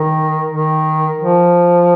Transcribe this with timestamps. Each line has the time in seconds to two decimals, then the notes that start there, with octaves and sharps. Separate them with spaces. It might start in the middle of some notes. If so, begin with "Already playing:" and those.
Already playing: D#3
0.52 D#3
1.21 F3